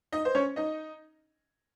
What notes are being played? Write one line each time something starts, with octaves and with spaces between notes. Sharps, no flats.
D#4 D#5
C5
C#4 C#5
D#4 D#5